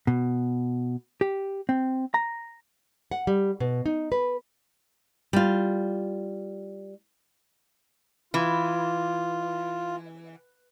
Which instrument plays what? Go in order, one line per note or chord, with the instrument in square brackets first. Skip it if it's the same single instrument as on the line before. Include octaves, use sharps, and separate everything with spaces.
[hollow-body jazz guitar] B2
G4
C4
A#5
[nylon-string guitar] F#5
G3
B2
D#4
B4
G3 F4
[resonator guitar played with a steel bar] E3 [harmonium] F4